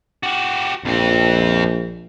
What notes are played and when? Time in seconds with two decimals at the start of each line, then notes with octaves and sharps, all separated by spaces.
0.23 F#4 G4
0.85 A#1 F2 C4